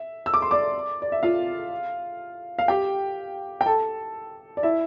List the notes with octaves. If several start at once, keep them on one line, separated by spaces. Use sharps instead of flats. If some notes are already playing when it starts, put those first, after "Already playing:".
Already playing: E5
E6
D6
C6
D5 D6
D5
E5
F4 F5
F5
G4 G5
G5
A4 A5
D5
E4 E5